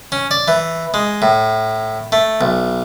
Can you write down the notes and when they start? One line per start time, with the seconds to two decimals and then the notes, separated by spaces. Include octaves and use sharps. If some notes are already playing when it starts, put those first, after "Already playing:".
0.12 C#4
0.31 D5
0.48 E3
0.94 G#3
1.22 A2
2.12 A3
2.41 B1